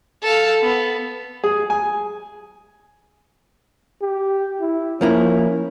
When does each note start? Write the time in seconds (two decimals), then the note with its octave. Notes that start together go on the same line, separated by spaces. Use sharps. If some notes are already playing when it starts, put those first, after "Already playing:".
0.23 A4 F5
0.61 B3
1.44 G#4
1.70 G#5
4.02 G4
4.61 E4
5.01 F3 A#3 C#4 E4